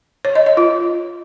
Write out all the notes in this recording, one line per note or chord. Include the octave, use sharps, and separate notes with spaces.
C#5
D#5
D#5
F4